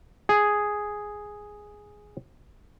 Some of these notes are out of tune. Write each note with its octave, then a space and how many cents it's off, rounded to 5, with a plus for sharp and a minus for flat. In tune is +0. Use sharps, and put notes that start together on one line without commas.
G#4 +0